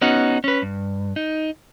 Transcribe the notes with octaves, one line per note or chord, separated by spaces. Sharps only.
B3 C#4 D#4 F#4
C#4 B4
G2
D#4